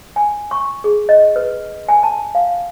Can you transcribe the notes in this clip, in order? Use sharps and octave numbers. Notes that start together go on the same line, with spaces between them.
G#5
C#6
G#4
D#5
B4
G#5
A5
F5